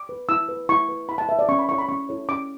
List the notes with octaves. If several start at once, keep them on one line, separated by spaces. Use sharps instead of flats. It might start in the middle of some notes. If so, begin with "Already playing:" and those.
Already playing: D6
B4
E4 E6
B4
E4 C#6
B4
E4 B5
A5
B4 E5
D5
C#4 C#6
B5
E4 A4 C#5 C#6
B5
C#4 C#6
E4 A4 C#5
C#4 D6